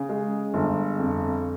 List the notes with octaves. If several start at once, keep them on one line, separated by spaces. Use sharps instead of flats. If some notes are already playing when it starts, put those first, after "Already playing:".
Already playing: C#3
G#3
G1
F2